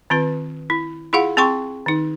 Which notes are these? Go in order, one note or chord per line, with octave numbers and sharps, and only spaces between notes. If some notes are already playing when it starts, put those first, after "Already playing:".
D#3 C4 F4 B4
E4
E4 F4 G#4 F5 F#5
C4 G#4 G5 C6 C#6
D#3 D#4